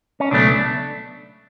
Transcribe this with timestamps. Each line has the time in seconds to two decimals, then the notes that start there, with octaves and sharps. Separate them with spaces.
0.20 C#4
0.31 C#2 B2 F#3 A3 D4